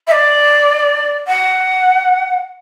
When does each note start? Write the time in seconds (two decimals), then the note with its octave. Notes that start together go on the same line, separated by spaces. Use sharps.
0.07 E5
0.11 D5
1.27 F#5